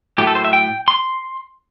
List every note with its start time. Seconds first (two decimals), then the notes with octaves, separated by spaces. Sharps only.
0.18 A2 F#3 A3 G4
0.27 A4
0.35 C5
0.45 E5
0.53 G5
0.88 C6